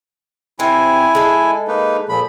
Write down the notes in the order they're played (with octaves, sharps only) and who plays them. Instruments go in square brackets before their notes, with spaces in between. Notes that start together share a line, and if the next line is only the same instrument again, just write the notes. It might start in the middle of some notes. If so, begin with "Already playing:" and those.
[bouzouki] C3 C4 [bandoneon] E4 G#5
[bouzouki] G#3 A4
[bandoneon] A#3 D#4 B4
A#2 F3 B5